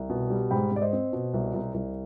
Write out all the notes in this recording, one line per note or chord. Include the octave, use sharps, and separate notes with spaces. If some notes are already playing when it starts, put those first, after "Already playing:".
Already playing: C2
B2
G3
G#2 G5 B5
G#2 D5
C5 D#5
C4
B2
C2
C2
C2